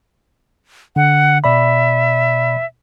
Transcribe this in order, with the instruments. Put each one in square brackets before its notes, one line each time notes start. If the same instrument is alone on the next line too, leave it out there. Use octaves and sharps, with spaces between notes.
[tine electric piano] D3 [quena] F#5
[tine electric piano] B2 D5 B5 [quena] E5